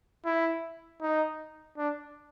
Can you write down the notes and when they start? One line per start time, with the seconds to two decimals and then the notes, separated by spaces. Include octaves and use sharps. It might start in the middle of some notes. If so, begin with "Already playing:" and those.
0.25 E4
1.01 D#4
1.77 D4